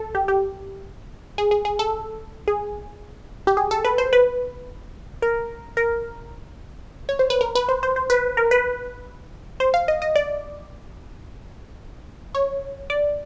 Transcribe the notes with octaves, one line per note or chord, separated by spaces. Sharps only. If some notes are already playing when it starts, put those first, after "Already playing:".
Already playing: A4
G4
G4
G#4
G#4
G#4
A4
G#4
G4
G#4
A4
B4
C5
B4
A#4
A#4
C#5
C5
B4
A#4
B4
C5
C5
C5
B4
A#4
B4
C5
F5
D#5
D#5
D5
C#5
D5